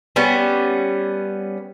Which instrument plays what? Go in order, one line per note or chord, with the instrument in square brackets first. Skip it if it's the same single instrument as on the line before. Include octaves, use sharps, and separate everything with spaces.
[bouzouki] G3 B3 C#4